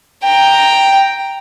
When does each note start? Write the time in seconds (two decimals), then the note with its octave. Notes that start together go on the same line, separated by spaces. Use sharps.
0.24 G5 A#5